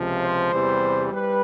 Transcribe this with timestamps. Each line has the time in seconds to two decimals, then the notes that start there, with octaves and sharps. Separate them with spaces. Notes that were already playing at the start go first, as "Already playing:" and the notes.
Already playing: C#2 C3 F3
0.22 C5
0.52 E2 C3 E3 G3
1.13 G3 B4